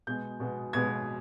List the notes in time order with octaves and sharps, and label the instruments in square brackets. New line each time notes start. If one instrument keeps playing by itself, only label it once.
[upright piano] B2 G#3 B3 G6
B2 G#3 B3
B2 G#3 B3 G#6